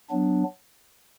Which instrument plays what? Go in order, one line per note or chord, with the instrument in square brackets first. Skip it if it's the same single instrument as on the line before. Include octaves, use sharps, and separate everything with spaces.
[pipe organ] F#3 B3 D4